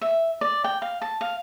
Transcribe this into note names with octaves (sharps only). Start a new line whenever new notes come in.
E5
D5
G5
F5
A5
F5